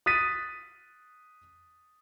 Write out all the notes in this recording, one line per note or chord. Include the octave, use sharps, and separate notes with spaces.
D#6 F#6 A6 B6 D#7